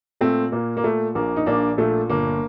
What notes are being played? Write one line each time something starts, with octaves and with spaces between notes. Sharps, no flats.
A#2 A3 C4
A#2 A#3
A#3
A#2 A3
A#1 A#3
D#4
A#1 A#3 D4
A#2 A3
G1 A#3